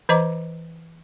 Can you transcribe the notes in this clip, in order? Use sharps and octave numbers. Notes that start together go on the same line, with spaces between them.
E3 C5 D#5 A#5 D6